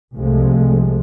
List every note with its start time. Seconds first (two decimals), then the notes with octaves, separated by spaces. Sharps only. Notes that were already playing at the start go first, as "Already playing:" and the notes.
0.16 C2 C3 F3 G#3 A3